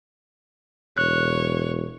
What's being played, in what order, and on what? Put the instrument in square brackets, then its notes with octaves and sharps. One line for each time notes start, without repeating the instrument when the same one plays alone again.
[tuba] E1 [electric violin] C#5 [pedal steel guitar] F#6